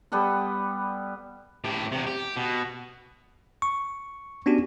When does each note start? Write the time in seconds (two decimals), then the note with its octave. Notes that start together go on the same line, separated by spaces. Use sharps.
0.12 G3 B3 A4 B4
1.64 A2 G4
1.92 E2 C3
2.07 G4
2.36 B2
3.62 C#6
4.46 B3 C#4 D4 F#4 G4